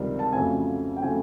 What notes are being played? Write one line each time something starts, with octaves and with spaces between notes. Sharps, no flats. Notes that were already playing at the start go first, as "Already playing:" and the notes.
Already playing: C#2 C3 D#3 G3
A5
F2 C#3 F#3 A3 C4 G#5
G5
C#3 F#3 A3 C4 G#5